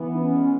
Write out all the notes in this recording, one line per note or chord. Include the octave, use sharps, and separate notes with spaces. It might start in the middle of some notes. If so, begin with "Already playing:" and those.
Already playing: E3 B3
D#4
C#4
G#3